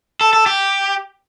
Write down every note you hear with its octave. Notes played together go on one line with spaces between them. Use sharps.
A4
A4
G4